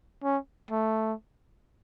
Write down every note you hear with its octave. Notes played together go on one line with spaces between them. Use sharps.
C#4
A3